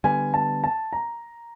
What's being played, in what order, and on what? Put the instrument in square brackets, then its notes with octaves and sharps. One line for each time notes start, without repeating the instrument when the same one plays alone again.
[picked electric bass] D3 G3 B3 [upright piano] G#5
[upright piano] A5
A5
A#5